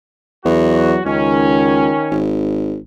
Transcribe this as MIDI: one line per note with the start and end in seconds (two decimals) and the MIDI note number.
0.45 0.97 40
0.45 1.01 54
0.45 1.01 66
1.05 1.92 37
1.05 2.22 51
1.05 2.22 61
2.11 2.78 32